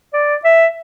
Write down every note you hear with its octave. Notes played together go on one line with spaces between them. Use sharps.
D5
E5